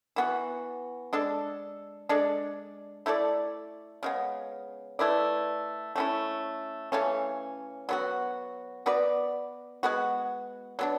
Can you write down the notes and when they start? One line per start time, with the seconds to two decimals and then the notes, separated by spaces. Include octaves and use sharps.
0.16 E3 B3 F#4
1.13 G#3 D4 A4
2.09 G#3 D4 A4 D5
3.06 A3 E4 A4 D5
4.03 C#3 G#3 B3
4.99 A3 E4 B4 D5
5.96 A3 C#4 E4
6.92 C#3 E3 A3 C#4
7.89 F#3 B3 F#4
8.86 B3 F#4 B4 D5
9.83 G#3 B3 F#4
10.79 F#3 B3 D4